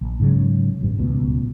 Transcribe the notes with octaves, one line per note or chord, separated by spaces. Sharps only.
A#1
G#2 C#3 F#3
A1 G2
D1 C#2 B2